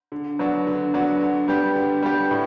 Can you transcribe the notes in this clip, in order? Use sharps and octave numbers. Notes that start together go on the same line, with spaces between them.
D3
F#3 B3 D4 F#4
D3
F#3 B3 D4 F#4
D3
G3 B3 D4 G4
D3
G3 B3 D4 G4
A2